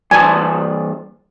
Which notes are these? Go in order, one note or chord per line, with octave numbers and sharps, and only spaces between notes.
G2 E3 G#5 A5